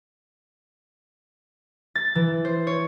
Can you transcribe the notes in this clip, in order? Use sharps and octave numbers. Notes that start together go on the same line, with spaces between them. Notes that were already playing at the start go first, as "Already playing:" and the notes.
A6
E3
C5
C#5